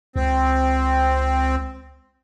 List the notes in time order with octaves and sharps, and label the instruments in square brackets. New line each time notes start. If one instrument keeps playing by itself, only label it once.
[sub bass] C#2 [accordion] C4